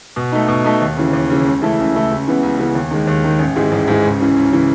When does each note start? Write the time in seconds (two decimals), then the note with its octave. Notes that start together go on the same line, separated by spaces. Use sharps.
0.16 B2
0.32 A3 D#4
0.48 B2
0.64 A3 D#4
0.81 D#2
0.97 C#3 E3
1.13 D#2
1.30 C#3 E3
1.45 C#2
1.62 C#3 E3 A3 E4
1.78 C#2
1.95 C#3 E3 A3 E4
2.11 C#2
2.27 C#3 E3 B3
2.43 C#2
2.58 C#3 E3 B3
2.75 D#2
2.91 D#3 G#3
3.07 D#2
3.24 D#3 G#3
3.39 A1
3.56 G#2 E3 G#3
3.72 A1
3.88 G#2 E3 G#3
4.04 C#2
4.20 C#3 E3
4.36 C#2
4.53 C#3 E3